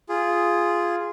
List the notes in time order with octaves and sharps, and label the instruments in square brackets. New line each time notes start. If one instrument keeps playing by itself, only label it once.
[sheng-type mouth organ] F4 G#4